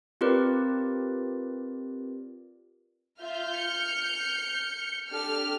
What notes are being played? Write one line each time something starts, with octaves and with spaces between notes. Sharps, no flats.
C4 F4 G4 A#4 B4 D5
F4 E5 F6 G6
C#7
D4 G4 A4 F6